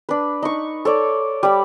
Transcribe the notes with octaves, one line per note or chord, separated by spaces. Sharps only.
D4 B4
D#4 C#6
A4 C#5 D5
G3 B5